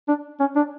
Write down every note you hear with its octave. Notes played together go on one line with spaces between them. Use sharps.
D4
C#4
D4